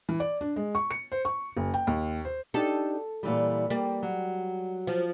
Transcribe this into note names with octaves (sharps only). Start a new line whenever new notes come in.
E3
D5
D4
G#3
C#6
C#7
C5
C#6
F#1
G5
D#2
C5
D4 D#4 G4 A4
A#2 E3 G3
G3 A#3
F#3
F3